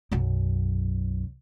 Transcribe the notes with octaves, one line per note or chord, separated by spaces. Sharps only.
B1 F#2